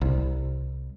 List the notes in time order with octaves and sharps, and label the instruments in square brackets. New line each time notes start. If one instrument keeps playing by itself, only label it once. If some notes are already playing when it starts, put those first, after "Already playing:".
[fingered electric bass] C2